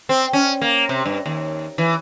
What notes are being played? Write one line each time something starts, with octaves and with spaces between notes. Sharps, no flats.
C4
C#4
A#3
C3
G2
D#2
E3